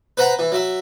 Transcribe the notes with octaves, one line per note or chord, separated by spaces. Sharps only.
B4 C5 F#5 A#5
E3
F#3 E5